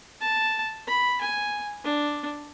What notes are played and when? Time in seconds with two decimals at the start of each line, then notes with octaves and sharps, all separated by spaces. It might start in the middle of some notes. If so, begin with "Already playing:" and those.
0.21 A5
0.88 B5
1.21 G#5
1.84 D4